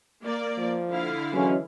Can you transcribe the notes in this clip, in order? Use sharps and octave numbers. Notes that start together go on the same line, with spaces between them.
A#3 D5
F3
D3 E4 F5
E3 F#3 G#3 C#4